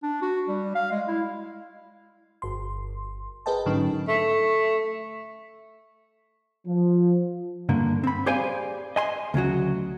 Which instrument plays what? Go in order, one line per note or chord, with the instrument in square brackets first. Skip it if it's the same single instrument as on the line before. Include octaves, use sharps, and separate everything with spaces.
[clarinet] D4
F#4
G3
F5
G#3
E4
[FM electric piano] G1 C6
G#4 A#4 B4 D#5 G5 A5
G#2 D3 F#3 C#4 D#4
[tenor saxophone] A3
[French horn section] F3
[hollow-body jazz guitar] G2 D3 A#3
C4 B5
G4 G#4 C5 D5 F5 G#5
D#5 G#5 C6
D2 C#3 F#3 F#4